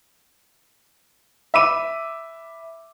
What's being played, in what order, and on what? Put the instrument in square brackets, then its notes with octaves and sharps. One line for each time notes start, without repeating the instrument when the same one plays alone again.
[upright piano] E5 B5 D6 D#7